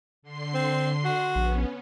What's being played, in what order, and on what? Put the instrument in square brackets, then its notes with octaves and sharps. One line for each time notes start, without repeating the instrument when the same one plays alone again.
[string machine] D3 C6 C7
[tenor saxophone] C4
F#4
[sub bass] A#1 [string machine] B3 C#4